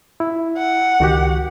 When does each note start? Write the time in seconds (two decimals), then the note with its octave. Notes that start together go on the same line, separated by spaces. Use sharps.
0.20 E4
0.57 F#5
1.00 C#2 D#3 F#4 G4